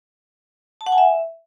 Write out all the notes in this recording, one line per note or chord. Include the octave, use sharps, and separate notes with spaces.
A5
F#5
G#5
E5